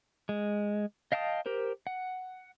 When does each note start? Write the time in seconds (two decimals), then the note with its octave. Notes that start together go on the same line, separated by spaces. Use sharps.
0.29 G#3
1.12 D#5 F5 G5 A5 D#6
1.46 G4 A#4 C5
1.87 F#5